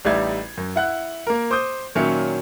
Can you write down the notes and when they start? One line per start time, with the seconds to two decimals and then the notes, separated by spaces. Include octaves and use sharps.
0.05 A1 G3 D#4 D5 E5 G#6
0.57 F#2
0.76 E4 F#5 F#6
1.27 A#3 A#4
1.51 C5 D6 D#6 G6
1.95 A#2 D#3 F#3 C#4 E5 C#7